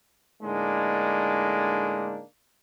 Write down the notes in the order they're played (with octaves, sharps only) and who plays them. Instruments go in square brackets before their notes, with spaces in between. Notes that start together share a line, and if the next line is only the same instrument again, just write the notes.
[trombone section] A2 D3 G#3 A#3 D4 D#4